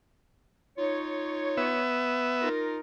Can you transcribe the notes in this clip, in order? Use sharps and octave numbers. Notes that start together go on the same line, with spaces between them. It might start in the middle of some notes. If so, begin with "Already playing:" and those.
D#4 F4 C#5
B3 E5
D#4 F4 A#4